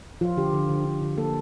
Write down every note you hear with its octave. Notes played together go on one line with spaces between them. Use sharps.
F3 F4
D3 G4
D3
D3
D3
D3
A#3 A4